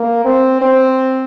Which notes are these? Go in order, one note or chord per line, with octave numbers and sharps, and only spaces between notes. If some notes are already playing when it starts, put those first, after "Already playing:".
Already playing: A#3
C4
C4